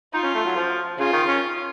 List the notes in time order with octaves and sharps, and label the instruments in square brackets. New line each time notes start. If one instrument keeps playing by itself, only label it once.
[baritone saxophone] D#4 [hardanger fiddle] F4
[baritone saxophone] C#4
A3
F#3
F3
[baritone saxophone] C#3 [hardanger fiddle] F4
[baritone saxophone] D#3
C#4